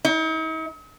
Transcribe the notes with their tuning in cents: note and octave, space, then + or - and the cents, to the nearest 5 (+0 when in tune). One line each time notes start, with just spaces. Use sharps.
D#4 +45